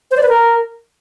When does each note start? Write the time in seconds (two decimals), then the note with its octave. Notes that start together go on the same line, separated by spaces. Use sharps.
0.11 C5
0.17 D5
0.23 B4
0.29 A#4